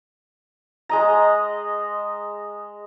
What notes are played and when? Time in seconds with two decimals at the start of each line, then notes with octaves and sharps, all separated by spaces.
0.89 G#3 D#5 A#5